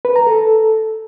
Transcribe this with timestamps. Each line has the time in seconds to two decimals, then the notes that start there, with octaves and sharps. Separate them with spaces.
0.05 B4
0.16 A#5
0.27 A4